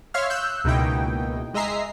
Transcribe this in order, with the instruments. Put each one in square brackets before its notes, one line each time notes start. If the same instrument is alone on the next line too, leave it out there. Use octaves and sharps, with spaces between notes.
[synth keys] C#5 E5 F5 C6 F6
E6 F#6 G6
C#2 B2 A#3 D#4 E4 G5
G#3 D#5 E5 A#5 C7